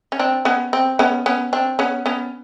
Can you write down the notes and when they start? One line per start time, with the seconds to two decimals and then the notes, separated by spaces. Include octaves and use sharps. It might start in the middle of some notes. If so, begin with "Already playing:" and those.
0.12 C#4
0.19 C4 D4
0.45 B3 C#4
0.73 C4
0.99 B3 C#4
1.26 B3 C#4
1.53 C4 D4
1.79 B3 C#4
2.06 B3 C#4